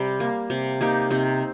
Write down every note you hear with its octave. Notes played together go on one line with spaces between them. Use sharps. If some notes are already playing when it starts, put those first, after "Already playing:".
Already playing: C3 G3
A#3
C3
A#3 D#4 G4
C3 C4 D#4